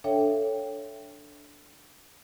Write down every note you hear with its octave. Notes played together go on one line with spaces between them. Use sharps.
D4 A4 C#5 E5 F5 G5